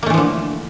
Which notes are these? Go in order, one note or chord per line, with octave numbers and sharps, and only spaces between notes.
D3 E3 F3 A3 A#3